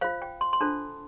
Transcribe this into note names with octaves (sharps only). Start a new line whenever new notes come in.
F4 C5 F5
G5
C6
C6
D4 F4 A4 C5 A5